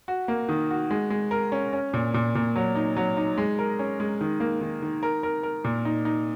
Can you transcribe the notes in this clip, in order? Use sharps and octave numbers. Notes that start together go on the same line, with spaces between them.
F#4
A#3
D#3
F#4
G#3
G#3
A#4
C#4
C#4
A#2
A#2
A#2
F#3
D#4
F#3
D#4
G#3
A#4
C#4
G#3
D#3
A#3
D#3
D#3
A#4
A#4
A#4
A#2
D#4
D#4